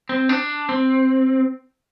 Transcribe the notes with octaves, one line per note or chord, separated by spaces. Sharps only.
C4
D4
C4